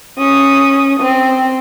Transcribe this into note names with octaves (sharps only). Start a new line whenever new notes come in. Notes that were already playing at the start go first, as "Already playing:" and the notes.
C#4 D#6
C4